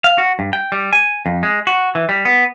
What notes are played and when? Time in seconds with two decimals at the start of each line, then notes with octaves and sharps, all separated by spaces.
0.04 F5
0.18 F#4
0.39 G2
0.53 G5
0.72 G3
0.93 G#5
1.26 F2
1.43 G#3
1.67 F#4
1.95 E3
2.09 G3
2.25 B3